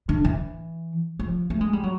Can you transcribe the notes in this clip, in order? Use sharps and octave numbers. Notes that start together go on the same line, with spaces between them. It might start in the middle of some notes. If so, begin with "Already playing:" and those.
D3
E3
F3
A3
G#3
G3
F#3